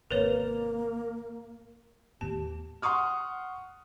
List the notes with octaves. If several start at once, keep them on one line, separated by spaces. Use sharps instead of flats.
G#1 E2 C3 A#3 A#4 B4 C#5
D#2 A2 B3 G4 A5
F#5 C6 C#6 D#6 F6